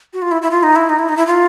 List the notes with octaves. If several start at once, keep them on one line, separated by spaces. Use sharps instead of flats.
F#4
F4
E4
E4
F4
D#4
E4
D#4
E4
D#4
E4
F4